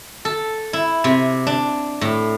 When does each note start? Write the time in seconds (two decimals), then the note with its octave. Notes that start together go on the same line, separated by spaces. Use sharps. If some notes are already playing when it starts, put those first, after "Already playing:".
0.25 A4
0.73 E4
1.04 C3
1.47 D4
2.01 A2